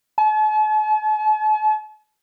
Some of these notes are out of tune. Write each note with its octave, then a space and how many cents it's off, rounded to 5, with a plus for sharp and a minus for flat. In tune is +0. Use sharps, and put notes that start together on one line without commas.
A5 -45